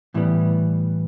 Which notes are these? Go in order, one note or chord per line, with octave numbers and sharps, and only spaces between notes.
A2 E3 G3 B3